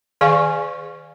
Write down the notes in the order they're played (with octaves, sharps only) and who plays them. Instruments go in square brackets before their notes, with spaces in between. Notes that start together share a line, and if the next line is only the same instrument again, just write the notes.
[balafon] D#3 G#4 D5 F5 G#5 C#6